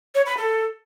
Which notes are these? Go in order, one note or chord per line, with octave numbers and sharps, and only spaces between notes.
C#5
B5
A4